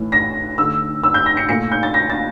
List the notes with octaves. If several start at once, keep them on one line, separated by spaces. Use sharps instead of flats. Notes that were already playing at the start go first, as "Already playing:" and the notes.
Already playing: A2 E3 A3
A#6
D3 A3 E6
E6
G6
A#6
C#7
A#2 A3 C#7
G6
A6
A#6
A6